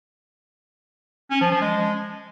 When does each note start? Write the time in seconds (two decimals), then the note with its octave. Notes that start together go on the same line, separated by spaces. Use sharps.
1.31 C#4
1.41 F3
1.51 F3
1.62 G#3